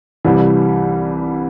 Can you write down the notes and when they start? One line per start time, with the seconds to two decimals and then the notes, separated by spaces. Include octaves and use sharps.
0.24 C2 C3 E3 G3